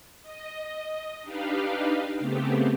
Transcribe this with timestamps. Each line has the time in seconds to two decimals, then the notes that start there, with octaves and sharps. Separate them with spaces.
0.22 D#5
1.23 D4 D#4 G4 B4 F5
2.19 C#3 A3 B3 C4 G4